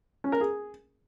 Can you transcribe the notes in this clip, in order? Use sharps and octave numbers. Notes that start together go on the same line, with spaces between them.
C#4
A#4
G#4